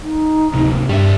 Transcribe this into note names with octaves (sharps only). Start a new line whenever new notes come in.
D#4
D1 C3 A#3
G2 G3 E5